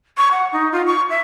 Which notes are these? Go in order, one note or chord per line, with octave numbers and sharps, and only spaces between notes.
C#6
F#5
D#4
F4
C#6
E5